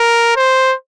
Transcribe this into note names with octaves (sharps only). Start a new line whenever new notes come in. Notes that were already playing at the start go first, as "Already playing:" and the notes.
Already playing: A#4
C5